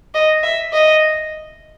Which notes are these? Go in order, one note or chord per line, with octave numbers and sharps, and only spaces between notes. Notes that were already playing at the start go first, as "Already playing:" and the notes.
D#5
E5
D#5